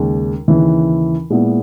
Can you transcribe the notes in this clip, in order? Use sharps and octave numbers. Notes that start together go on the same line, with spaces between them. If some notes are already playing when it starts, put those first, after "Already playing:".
Already playing: D#2 C#3 G#3
D#2 C#3 E3
A#2 G#3 B3 E4